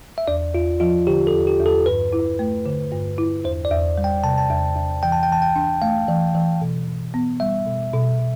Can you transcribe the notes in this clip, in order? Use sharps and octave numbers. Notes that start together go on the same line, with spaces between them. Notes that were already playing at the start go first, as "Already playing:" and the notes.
E5
E2 D5
E2 F4
F3 F4
D3 G4
A4
E2
G4
E2
A4
G2 B4
E4
A3
D3
G2
E4
E2 C5
D5
E2
G3
G5
C3 A5
A5
E2
E2
E3 G5
A5
G5
E3 A5
G5
D4
A3 F5
E3
E3
B2
B2
B3
G3 E5
B2
B2
B2